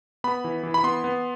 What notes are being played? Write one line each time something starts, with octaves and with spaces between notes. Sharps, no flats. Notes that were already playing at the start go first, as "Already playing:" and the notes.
B3 B5
E3
E3
B5
B3 C6
B3